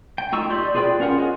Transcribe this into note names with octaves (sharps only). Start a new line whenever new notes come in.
G5
A3 D#4 F4 C#6 E6
G4 D5 C6 G6
F4 G#4 B4 D5 G5
C#4 F4 A#4 F#5
G#4 C#5 D#5